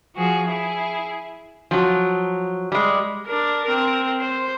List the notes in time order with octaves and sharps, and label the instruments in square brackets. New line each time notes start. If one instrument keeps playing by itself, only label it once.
[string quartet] F3 F#4 G#4
E4 G#4
[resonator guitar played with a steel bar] F3 F#3
G3 G#3
[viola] D4 A#4
C4 A#4
C5